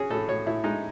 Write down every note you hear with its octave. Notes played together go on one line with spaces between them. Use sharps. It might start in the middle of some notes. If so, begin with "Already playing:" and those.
Already playing: C#4 F#4 G#4
A2 A4
A2 C#5
A2 E4
G#3 D#4